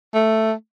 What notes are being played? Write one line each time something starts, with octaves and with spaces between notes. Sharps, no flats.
A3